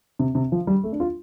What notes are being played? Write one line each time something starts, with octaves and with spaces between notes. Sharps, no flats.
C3
C3
F3
G3
A3
D4
F4